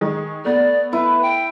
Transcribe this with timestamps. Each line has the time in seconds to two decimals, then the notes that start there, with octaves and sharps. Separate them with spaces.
0.01 D#3 G#3
0.45 A3 B3 D5
0.93 E4 B4
1.22 G5